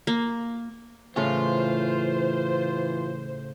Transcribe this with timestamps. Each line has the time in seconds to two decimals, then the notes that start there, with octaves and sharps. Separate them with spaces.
0.07 A#3
1.16 A2 C#3 E3 F4 C5